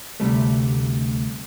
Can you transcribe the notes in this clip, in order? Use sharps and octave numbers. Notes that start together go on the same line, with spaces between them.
D2 C3 G3 A3